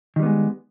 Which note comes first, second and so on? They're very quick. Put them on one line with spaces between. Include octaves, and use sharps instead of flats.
D#3 G3 B3 G#3